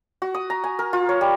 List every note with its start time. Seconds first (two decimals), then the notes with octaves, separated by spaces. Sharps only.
0.22 F#4
0.35 D#6
0.50 A#5
0.64 G#5
0.79 A#4
0.93 F4
1.09 C#5
1.21 G3